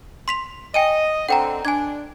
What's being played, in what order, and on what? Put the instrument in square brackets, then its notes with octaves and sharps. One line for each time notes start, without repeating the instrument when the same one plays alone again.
[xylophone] C6 B6 F7
[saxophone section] D#5 [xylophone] G5 G#5 D#7
[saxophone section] D3 C4 [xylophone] F#5 G5 A#5
[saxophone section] D4 [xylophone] G#5 G#6